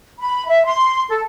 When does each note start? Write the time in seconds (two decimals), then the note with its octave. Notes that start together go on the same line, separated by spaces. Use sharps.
0.19 B5
0.47 E5
0.65 C6
1.09 A4